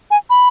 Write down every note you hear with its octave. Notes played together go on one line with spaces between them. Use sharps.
G#5
B5